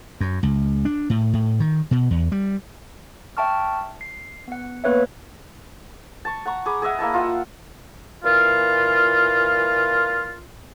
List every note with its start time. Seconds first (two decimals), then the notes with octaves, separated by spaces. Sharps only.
0.21 F#2
0.43 C#2
0.85 D4
1.10 A2
1.34 A2
1.60 D#3
1.91 B2
2.11 E2
2.32 G3
3.37 E5 G5 A5 C#6 F6
4.01 C7
4.48 B3 F#5
4.84 A#3 B3 B4 C#5 E5
6.25 A5 C#6
6.45 F#5 A#5 C#6
6.66 G#4 A#5 B5 D6
6.82 G#4 D#5 E5 F#5
6.99 A#3 E4 D#5 A5
7.14 F4 E5 F#5
8.24 A#2 E3 F4